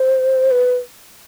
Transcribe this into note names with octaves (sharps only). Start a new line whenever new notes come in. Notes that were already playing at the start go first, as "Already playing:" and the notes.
Already playing: C5
B4